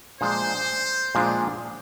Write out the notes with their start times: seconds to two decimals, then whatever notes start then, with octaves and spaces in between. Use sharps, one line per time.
0.21 A#2 F3 G#3 D4 C5
1.15 A#2 F3 G#3 D4